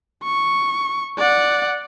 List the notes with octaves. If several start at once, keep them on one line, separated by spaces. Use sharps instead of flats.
C#6
D5 F#5